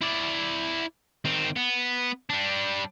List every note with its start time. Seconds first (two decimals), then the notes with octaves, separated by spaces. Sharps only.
0.02 E4 D5
1.25 D#3 C4
1.56 B3
2.30 G3 D4